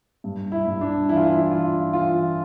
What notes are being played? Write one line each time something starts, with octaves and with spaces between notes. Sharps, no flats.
G2
E4
G2
D4
E3 E4
F4
E4
E3 F4
E3 F4